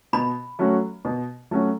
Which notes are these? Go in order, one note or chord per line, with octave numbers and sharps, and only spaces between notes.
B2 B5
F#3 A3 C#4 F#4
B2
F#3 A3 C#4 F#4